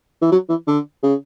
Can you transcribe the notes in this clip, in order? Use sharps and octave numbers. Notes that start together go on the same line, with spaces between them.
E3
F#3
E3
D3
C#3